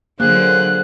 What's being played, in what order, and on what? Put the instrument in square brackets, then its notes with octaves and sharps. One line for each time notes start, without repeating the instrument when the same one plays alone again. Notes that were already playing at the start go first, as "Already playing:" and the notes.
[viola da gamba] D3 F#3 [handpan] A#3 [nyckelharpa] G#4 C5 [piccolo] F#6